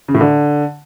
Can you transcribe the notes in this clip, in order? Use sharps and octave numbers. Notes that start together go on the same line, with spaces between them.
C#3
A2
D3